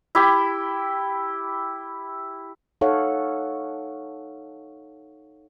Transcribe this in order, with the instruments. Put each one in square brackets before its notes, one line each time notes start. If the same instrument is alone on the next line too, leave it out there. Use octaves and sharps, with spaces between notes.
[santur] E4 G4
[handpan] D#4 A4 C#5 F5 F#5